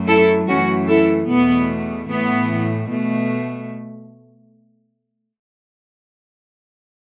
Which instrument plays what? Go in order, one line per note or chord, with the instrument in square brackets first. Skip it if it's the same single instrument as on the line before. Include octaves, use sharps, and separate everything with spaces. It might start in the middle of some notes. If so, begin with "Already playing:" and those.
Already playing: [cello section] F#2 F#3 A3
E4 A4
F#2 E3 A3 C#4 F#4
E4 A4
E2 B2 A3 B3
A2 E3 A3 B3
B2 A3